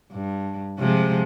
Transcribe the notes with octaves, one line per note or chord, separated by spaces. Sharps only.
G2
C3 F3 G#3